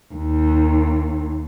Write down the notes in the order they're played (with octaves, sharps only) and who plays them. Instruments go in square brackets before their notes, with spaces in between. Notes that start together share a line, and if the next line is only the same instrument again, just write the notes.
[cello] D#2